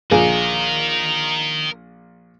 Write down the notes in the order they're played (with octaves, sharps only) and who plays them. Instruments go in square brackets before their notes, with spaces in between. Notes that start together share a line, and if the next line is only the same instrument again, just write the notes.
[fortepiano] A#1 G#4 [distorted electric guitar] A#4 D#5